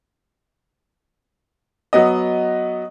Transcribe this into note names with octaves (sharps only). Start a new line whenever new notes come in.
F#3 B3 D#5